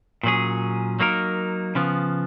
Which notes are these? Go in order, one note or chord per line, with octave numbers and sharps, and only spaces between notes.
A#2 F#3 C#4 G#4
F#3 A#3 D#4 A#4
C#3 F3 B3